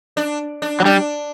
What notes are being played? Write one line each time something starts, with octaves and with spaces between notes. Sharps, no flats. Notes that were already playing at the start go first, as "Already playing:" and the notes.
D4
D4
F#3
G3 D4